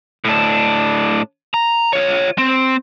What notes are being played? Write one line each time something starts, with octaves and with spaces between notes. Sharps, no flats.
A2 D4
A#5
F4 C#5
C4